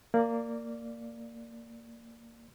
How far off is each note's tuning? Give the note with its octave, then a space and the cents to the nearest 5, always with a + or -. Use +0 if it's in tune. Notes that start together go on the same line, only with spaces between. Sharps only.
A#3 -15 D5 +0